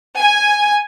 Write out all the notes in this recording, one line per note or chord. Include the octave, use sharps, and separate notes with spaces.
G#5